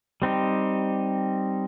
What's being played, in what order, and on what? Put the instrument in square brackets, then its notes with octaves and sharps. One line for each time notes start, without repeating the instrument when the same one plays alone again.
[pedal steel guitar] G3 C4 D#4 G4